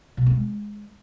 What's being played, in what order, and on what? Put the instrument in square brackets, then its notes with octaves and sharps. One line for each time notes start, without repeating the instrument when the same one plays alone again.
[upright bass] B2
C4
G#3